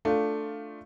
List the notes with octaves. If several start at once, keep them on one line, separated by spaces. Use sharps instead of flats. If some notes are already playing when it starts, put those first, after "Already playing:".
A3 D4 F4